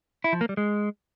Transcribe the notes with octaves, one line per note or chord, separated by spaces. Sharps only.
E4
F3
A#3
G3
G#3